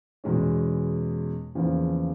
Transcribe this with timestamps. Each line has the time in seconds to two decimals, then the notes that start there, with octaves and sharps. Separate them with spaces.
0.24 E2 B2 G#3 C#4
1.55 E2 C#3 F3 A#3